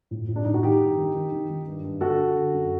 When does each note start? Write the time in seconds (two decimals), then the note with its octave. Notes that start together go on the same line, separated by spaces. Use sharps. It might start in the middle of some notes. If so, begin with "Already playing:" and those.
0.11 A2
0.28 A2
0.36 D4
0.45 A2 D#4
0.54 F#4
0.63 D#3 D#4 G4
0.80 G2
0.97 D#3
1.15 D#3
1.32 D#3
1.50 D#3
1.66 G2
1.84 G2
2.01 D3 F#4 A4
2.19 D3
2.35 D3
2.53 F#2